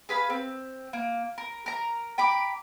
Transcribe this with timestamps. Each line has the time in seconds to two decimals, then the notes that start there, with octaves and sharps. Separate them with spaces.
0.09 G#4 B4 F5 B5
0.30 C4
0.93 A#3
1.38 A#4
1.66 A#4 A#5
2.18 G5 A#5 B5 D6